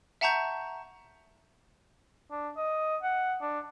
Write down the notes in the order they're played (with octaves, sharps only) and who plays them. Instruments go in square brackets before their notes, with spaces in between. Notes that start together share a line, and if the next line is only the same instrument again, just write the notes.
[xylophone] E5 F#5 A5 A#5 C#6 G6
[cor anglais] D4
D#5
F#5
D4